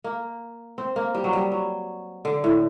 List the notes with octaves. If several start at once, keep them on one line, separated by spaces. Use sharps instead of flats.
A#3
C4
A#3
G3
F#3
G3
F#3
D3
A2